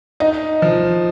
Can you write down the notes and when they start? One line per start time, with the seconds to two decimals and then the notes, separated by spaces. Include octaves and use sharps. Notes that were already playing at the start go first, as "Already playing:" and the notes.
0.20 D#4 D#5
0.62 F3